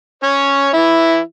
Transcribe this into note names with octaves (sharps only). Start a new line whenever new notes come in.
C#4 C#5
E3 E4